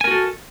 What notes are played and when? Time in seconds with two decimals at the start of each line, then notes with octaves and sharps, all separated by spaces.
0.01 G#5
0.04 A#4
0.08 F#4
0.11 A4